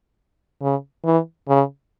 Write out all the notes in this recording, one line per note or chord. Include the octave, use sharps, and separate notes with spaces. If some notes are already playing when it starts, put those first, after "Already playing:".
C#3
E3
C#3